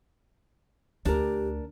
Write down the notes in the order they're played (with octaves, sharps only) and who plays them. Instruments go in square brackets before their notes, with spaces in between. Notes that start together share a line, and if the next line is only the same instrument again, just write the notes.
[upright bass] D2 [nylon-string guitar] D4 A#4 [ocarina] G4